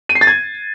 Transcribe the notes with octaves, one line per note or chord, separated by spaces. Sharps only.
D#7
C7
A6
G#6